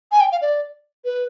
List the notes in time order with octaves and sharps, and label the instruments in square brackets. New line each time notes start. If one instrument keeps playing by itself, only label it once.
[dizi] G#5
G5
F5
D5
B4